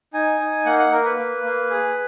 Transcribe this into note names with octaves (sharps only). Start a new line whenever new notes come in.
D#4 G#5
D#4
A#3 F#5
F#5
A#3 A#4
B4
A#3
A#3
G#4